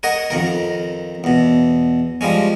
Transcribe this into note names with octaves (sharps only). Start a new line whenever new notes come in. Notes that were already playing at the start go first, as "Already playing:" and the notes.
A#4 C#5 D#5 F#5
F2 D#3 A#4
E2 B2
F3 G3 G#3 C#4